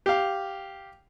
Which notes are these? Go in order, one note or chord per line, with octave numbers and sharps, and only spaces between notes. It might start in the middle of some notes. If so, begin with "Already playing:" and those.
G4 F5